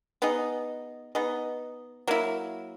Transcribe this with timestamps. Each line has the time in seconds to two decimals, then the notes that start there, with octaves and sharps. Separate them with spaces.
0.22 B3 D#4 G#4 D#5
1.15 B3 D#4 G#4 D#5
2.08 F#3 A#3 E4